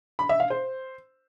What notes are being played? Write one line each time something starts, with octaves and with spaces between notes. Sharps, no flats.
B5
E5
F5
C5